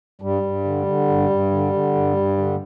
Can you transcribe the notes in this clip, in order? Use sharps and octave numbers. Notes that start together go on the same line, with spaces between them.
G2 G3
G2
D3
D3
G2
G2
D3
D3
G2
G2
D3